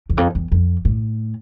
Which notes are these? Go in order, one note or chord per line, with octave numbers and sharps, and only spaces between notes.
E2
F2
E2
F2
A2